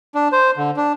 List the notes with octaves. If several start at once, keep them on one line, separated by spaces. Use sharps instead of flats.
D4
C5
D3
D4